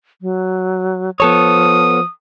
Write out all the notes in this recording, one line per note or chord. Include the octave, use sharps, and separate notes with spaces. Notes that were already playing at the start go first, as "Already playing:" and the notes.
F#3
F3 B3 A4 C#5 D#6